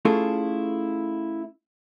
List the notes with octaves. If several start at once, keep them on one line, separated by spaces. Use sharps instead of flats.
A3 C#4 E4 F4 G#4 A4